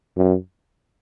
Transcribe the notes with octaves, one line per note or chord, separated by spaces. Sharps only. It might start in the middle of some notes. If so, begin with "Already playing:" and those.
F#2